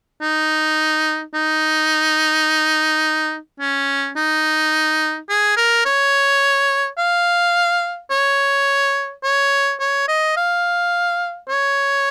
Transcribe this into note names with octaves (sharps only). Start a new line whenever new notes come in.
D#4
D#4
C#4
D#4
G#4
A#4
C#5
F5
C#5
C#5
C#5
D#5
F5
C#5